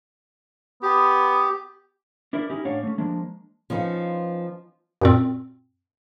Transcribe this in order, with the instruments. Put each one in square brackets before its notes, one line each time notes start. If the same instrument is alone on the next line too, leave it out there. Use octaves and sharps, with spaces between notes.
[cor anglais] B3 [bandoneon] G4
[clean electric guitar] D4 E4 A#4
C#4 D#4 E4 G4
A2 C#4 D4 C#5 F5 F#5
A3 C#4
F3 G#3 A#3 D4
[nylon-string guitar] F3 B3 C#4 D#4 F4
[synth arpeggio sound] F#2 A#2 C4